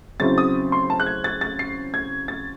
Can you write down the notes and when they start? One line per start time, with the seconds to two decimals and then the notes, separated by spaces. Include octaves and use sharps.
0.20 C#3 F#3 C4 E4 A6
0.38 D#6
0.72 C6
0.90 A5
1.00 F#6
1.06 G#6
1.24 A6
1.41 A6
1.59 C7
1.94 G#6
2.28 A6